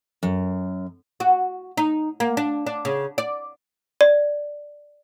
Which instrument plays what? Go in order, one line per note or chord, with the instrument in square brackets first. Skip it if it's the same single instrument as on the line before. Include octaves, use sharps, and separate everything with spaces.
[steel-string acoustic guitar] F#2
[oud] F#4
D#4
A#3
D4
D4
C#3
D5
[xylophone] D5